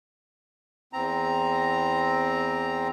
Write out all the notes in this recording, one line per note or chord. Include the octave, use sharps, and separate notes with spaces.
E2 C4 A#5